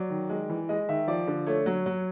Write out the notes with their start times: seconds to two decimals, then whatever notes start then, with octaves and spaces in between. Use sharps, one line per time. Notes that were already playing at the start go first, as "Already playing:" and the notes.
Already playing: F#3 D5
0.10 D#3
0.30 G#3
0.49 E3
0.69 G#3 D#5
0.89 D#3 E5
1.08 F3 D5
1.27 D3
1.46 A3 C#5
1.66 F#3
1.86 F#3